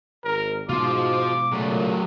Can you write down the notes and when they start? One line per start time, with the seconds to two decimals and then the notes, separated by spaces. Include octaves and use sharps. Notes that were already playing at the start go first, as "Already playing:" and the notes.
0.24 G#1 A#4
0.69 G#2 B2 G#3 F4 F#4 C5 D6
1.53 A#2 C#3 F#3 A3